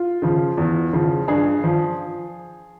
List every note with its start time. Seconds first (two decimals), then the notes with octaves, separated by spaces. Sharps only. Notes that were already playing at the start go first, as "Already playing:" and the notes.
Already playing: F4
0.22 C#3 F3
0.58 E2
0.93 C#3 F3
1.28 G2 G#4
1.64 F3